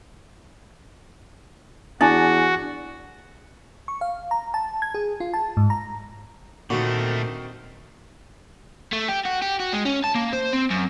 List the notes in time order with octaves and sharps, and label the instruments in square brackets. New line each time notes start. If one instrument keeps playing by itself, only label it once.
[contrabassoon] E2 [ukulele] D4 [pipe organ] F#4 [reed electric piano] G#5 A6
[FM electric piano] C#6
F5
A#5
A5
G#6
G#4
F4
A5
G#2
A#5
[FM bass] A#2 [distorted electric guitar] D3 A3 [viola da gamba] D#3 C4 [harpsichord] F#4
[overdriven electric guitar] A3
G4
F#4
G4
F#4
G#3
C#4
A5
A#3
C5
C4
F#2